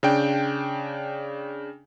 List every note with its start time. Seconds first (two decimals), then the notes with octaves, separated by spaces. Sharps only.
0.03 C#3 D4 G5